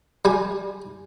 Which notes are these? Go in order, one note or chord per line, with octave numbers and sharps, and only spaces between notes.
G3 G#5